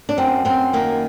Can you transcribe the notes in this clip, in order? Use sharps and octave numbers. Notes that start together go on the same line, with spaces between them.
D4
F#2 C4
F#2 C4
D#3 A#3